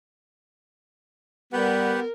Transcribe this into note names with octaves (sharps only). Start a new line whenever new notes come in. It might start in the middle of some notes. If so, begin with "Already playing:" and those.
G3 B3 G4 A#4 B4 F#5